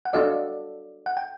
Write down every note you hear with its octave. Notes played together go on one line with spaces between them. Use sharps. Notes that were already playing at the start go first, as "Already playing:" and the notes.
F#5
D4 F#4 A4 D5 D#5 F5
F#5
G5